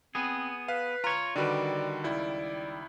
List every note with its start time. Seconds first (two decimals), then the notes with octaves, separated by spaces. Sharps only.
0.15 B3 C4 G#4
0.68 B4 F5
1.04 F4 C#5 A#5
1.36 D3 D#3 G3 F#4 B4 D5
2.04 C#2 E4 D5